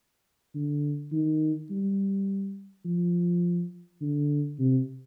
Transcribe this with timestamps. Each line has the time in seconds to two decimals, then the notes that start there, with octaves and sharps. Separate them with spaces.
0.55 D3
1.12 D#3
1.71 G3
2.85 F3
4.01 D3
4.59 C3